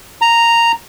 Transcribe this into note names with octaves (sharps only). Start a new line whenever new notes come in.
A#5